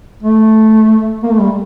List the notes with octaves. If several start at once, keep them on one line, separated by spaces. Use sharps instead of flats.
A3
A#3
A3
G3